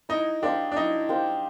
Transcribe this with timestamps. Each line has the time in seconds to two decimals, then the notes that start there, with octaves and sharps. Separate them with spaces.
0.09 D#4 E4
0.42 D4 G4 C5 F5
0.72 D4
0.76 D#4 E4
1.09 G4 C5 F5